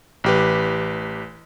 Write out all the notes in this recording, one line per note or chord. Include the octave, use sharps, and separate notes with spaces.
A1 G4 B4